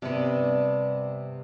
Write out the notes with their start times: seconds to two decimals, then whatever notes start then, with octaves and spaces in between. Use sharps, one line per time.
0.02 G2 C3 B3 D5 A5